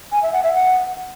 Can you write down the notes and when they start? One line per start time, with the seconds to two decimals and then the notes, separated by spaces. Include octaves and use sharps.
0.12 G#5
0.22 E5
0.33 F#5
0.43 E5
0.54 F#5